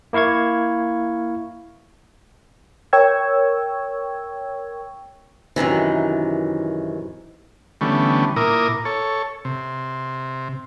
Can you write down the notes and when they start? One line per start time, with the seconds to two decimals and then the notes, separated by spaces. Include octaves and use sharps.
0.13 A#3 E4 F5 C#6 G#6
2.93 A#4 C#5 G5 C#6 E6 G#6
5.56 F#2 C3 D#3 E3
7.81 D3 E3 G3 A3 B3 C#4
8.36 A#2 E4 A#4 D6 D#6
8.85 A4 C#5
9.45 C3